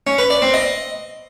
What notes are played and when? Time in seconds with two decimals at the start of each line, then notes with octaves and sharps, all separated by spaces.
0.07 C#4
0.18 B4
0.30 D5
0.42 C4
0.54 D#5